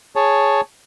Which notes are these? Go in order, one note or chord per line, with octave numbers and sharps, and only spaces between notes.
G#4 C#5 A5